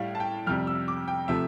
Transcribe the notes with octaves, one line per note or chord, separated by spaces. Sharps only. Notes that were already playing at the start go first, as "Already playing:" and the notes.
Already playing: A2 G3 F5
A5
G5
F2 C3 G3 F6
E6
D6
G5
C3 F3 A3 E5